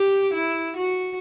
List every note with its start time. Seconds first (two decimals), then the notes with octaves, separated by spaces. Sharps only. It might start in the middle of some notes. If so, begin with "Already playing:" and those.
Already playing: G4
0.33 E4
0.76 F#4